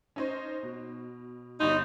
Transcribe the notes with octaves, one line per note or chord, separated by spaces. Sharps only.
C#4 D#4 C5
B2
G1 G2 D#4 C6